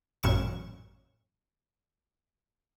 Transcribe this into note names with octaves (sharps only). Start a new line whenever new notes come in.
A1 F#2 A#2 C#6 E7